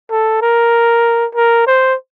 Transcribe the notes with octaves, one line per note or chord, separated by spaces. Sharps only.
A4
A#4
A#4
C5